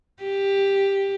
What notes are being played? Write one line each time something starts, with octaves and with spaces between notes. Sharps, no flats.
G4